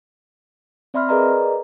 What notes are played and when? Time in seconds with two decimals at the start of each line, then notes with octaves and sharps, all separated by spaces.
0.94 C4 D5 E5 B5 C6 F6
1.09 G#4 A#4 B4 D5 D#5 A#5